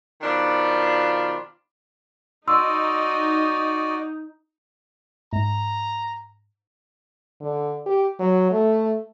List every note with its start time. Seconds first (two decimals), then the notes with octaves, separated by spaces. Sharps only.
0.22 B2 D#3 F3 D4 F4
2.48 D#4 F#4 D5 D#5 C6 E6
5.33 G#2 A#5
7.41 D3
7.86 G4
8.20 F#3
8.52 A3